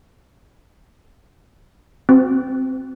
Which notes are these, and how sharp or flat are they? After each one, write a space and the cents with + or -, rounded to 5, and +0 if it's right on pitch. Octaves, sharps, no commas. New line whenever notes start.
C4 +0 F#4 -20 C5 -40